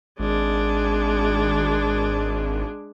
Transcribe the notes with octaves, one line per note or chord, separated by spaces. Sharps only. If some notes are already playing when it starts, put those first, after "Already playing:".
G#1 G#3 D4